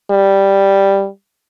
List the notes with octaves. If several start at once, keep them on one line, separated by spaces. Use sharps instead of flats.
G3